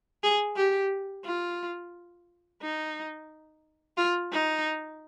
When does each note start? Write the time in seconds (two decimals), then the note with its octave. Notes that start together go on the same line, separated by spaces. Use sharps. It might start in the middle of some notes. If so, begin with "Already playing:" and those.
0.23 G#4
0.56 G4
1.25 F4
2.62 D#4
3.97 F4
4.32 D#4